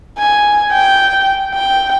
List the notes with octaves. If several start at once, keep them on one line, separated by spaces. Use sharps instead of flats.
G#5
G5
G5